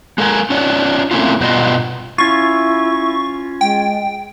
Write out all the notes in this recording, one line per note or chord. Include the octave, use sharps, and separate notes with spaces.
G#3 A4 A#4 G5 G#5
C#4 D4 F4 C#5 D5
A3 A#3 C4 C#4 E4 F4
G2 B2 G3 B3 F4 D#5
C#4 E4 F4 C#6
G#3 G5